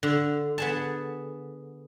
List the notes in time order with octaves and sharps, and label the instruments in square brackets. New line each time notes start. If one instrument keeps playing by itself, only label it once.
[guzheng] D3
B3 G#4 A5